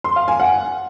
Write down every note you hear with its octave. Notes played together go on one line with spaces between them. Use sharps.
C6
F5
G#5
F#5